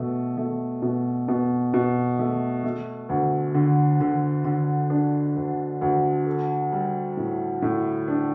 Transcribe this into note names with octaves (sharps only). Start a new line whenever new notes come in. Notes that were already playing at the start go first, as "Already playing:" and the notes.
Already playing: B2 A3
A3
B2
B2
B2
A3
A3
D2
D3
D3
D3
D4
D2
D2
A4
G3
A2
A2
D4